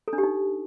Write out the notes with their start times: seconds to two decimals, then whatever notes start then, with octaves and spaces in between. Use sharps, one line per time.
0.08 A4
0.13 D4
0.18 G4
0.23 D#4